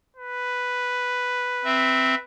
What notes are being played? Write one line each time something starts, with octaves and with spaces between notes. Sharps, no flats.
B4
C4 E5